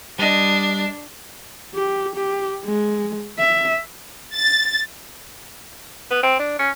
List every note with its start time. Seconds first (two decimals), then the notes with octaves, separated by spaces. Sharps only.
0.19 G3 D4 D#5
1.75 G4
2.15 G4
2.64 G#3
3.38 E5
4.34 A6
6.11 B3
6.23 C4
6.39 D4
6.59 C#4